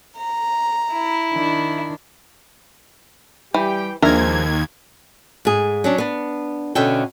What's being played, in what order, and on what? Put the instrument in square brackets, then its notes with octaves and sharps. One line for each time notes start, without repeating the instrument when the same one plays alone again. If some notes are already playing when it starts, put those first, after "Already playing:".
[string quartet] A#5
[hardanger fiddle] E4
[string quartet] D#3 D4
[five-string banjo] E3 [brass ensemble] G3 G4 G5
[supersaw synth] D#2 G#6 [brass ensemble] F3 G#3 C4 [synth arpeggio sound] D4 E5 [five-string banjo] A#4
[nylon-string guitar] G#2 G#4
F#3 C#4 D4
B3 D4
B2 D3 B3 C#4 E5 G5